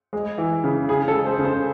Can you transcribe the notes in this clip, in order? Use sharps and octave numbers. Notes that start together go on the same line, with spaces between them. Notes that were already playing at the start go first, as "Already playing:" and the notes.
G#3
E3
C#3
C#3 G#4
A4
G#3
C5
C#3
C5